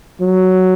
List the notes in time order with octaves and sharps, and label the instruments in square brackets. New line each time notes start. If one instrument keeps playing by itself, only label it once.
[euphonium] F#3